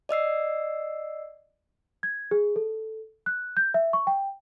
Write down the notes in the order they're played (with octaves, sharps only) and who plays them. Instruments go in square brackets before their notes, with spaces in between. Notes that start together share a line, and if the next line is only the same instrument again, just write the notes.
[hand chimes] D5 D#5 E6 C7
[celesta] G#6
G#4
A4
F#6
G6
E5
C#6
G5